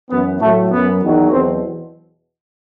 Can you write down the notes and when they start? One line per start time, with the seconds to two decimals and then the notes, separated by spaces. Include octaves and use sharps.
0.11 F#2 E3 B3
0.41 A2 F#3 A3
0.71 F#2 F#3 B3
1.01 E2 D#3 F#3
1.32 E2 B2 F#3 C4